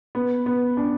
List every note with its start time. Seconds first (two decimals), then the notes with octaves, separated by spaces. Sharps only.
0.15 B3
0.46 B3
0.77 D4